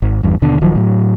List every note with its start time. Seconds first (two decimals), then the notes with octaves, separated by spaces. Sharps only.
0.02 G#1
0.23 G1 E2 G2
0.42 D#2 B2 D3
0.61 D1 D#3 F3 F#3
0.76 A2 F#3